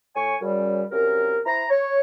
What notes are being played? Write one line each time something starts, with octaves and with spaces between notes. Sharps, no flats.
A2 C#5 G#5 C#6
F#2 C#3 G3
C2 F#2 A#4
E4 C5 A#5
C#5